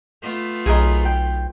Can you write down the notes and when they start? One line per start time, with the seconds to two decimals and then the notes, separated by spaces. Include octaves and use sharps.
0.22 A3 B3 F4
0.66 B1 G#4 A#4 D#5
1.05 G5